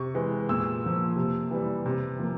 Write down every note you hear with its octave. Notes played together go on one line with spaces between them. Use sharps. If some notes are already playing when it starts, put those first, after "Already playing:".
Already playing: C3 C#6
E3 G#3
A#2 E6
F3 A#3
C3
E3 G3
C3
F3 A#3